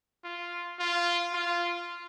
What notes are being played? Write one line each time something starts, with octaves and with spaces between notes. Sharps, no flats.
F4
F4
F4